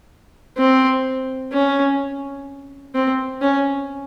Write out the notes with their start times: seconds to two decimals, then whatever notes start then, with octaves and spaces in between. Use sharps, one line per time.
0.58 C4
1.53 C#4
2.95 C4
3.41 C#4